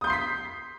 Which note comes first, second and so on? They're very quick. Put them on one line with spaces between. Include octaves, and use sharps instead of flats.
D#6 G6 C6 C7 B6